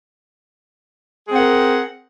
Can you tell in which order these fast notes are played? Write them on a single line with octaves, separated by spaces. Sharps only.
G#4 C4 F#5 A#4